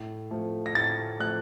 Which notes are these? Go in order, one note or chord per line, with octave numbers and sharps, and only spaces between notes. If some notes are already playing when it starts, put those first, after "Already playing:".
Already playing: A2
F3 A3
A#6
A2 A6
F3 A3 F#6